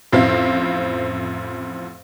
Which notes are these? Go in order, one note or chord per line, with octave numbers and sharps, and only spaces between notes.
A1 F2 C4 E4 C5 F5